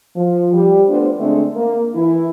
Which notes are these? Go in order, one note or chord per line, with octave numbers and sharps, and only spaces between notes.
F3
G3 G4
A3 B3 D4 F4 C5
D3 G#3 A3 C4 D4
A#3
E3 E4